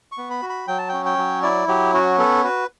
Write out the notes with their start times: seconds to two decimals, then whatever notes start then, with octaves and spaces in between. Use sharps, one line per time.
0.12 C#6
0.18 B3
0.31 B5
0.42 F#4
0.49 B5
0.68 F#3 G5
0.78 A5
0.89 C#4 G5
1.06 G5
1.18 F#3
1.43 E4 D5
1.68 F#3 G4
1.93 C#4 F#4
2.18 B3 A4
2.44 F#4 B4